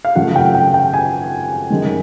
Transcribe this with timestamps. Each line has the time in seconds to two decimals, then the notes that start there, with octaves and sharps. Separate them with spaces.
0.05 F5
0.15 G#1 F#2 C#3 F3 A3 F#5
0.36 G5
0.55 G5
0.74 G5
0.94 G#5
1.70 F#2 D#3 G#3